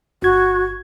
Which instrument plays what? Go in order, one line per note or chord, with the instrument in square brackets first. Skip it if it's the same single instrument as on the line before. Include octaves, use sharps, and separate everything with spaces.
[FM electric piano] G1 G#6 [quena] F#4